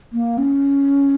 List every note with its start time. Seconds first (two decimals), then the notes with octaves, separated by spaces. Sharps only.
0.13 A#3
0.38 C#4